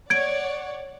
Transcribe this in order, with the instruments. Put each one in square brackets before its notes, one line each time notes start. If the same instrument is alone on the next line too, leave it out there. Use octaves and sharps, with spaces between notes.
[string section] C#5 D5 F#5 [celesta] G#6 D7